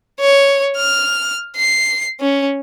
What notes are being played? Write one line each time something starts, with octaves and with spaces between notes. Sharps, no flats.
C#5
F6
C7
C#4